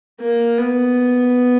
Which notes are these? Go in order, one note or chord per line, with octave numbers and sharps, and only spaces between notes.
A#3
B3